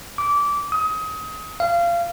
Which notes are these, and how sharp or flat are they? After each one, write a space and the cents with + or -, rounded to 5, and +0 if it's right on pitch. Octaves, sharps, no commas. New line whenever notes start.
D6 -20
D#6 +25
F5 -25